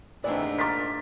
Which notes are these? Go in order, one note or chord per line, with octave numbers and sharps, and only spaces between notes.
G#2 C3 D#3 E3 A3 D4 D5
A#2 A#4 D6 A6 B6